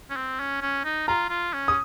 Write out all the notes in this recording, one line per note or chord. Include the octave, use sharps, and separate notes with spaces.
C#4
C4
C#4
C#4
D#4
F4 A#5
F4
C#4
D#6